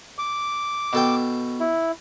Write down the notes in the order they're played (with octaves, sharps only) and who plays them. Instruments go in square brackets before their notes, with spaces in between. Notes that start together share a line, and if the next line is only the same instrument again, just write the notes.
[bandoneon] D6
[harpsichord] B2 A4 G5
[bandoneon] E4